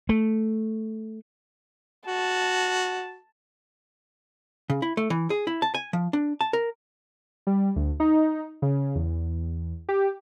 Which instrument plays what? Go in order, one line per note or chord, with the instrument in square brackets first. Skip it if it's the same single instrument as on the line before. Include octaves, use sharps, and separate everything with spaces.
[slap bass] A3
[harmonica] F#4 [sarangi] A5
[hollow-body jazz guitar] C#3
E4
A3
E3
G#4
E4
A5
G#5
F3
D4
A5
A#4
[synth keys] G3
D2
D#4
C#3
E2
G4